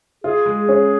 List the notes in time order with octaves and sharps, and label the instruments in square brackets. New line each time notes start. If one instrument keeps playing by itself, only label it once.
[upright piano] F4 [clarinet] G#4
[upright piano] G#3
C#4